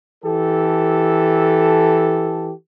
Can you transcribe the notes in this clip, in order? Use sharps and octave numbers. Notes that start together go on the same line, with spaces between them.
E3 G4 A4